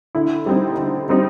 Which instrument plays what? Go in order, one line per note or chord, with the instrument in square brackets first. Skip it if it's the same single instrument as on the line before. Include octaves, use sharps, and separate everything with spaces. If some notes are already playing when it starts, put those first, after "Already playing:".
[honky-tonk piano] D3 E4
G3 C4 D#4
D3
G3 C4 D#4